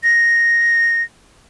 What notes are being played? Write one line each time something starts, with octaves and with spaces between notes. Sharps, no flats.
A#6